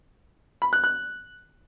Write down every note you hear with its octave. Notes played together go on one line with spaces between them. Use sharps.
B5
F#6
F#6